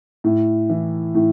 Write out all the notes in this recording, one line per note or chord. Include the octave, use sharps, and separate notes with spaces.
A2
E3
A2